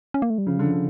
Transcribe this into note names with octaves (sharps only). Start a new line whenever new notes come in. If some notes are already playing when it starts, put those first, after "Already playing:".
C#4
A#3
A3
G3
C#3 F3
D3 G3
F3
D3